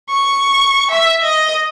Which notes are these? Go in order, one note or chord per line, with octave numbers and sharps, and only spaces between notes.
C#6
E5
D#5